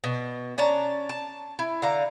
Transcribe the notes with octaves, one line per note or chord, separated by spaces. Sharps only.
B2
C#4 D4 A5 A#5
A5
E4
D3 F5 A#5